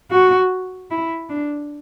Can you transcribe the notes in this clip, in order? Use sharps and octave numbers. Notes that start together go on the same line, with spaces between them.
F#4
E4
D4